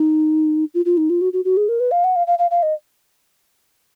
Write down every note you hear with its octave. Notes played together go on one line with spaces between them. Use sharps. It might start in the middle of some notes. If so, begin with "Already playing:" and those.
Already playing: D#4
F4
F4
D#4
F4
F#4
F#4
F#4
G#4
A#4
B4
F5
F#5
F5
F5
F5
F5
D#5